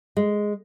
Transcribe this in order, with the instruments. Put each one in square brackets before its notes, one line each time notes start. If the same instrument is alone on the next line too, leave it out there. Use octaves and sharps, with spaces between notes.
[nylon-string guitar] G#3